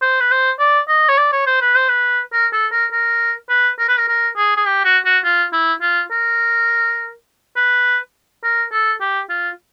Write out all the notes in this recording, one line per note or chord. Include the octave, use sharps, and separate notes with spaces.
C5
B4
C5
D5
D#5
C#5
D5
C#5
C5
B4
C5
B4
A#4
A4
A#4
A#4
B4
A#4
B4
A#4
A#4
G#4
G#4
G4
F#4
F#4
F4
E4
F4
A#4
B4
A#4
A4
G4
F4